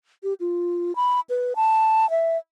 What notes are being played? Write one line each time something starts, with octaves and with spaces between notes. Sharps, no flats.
G4
F4
B5
B4
A5
E5